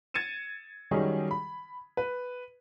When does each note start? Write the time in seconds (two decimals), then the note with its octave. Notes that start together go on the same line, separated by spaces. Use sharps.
0.14 G#6 A6 C#7 D#7 E7
0.91 D#3 F#3 G3 C#4 D#4 G#4
1.31 B5
1.97 B4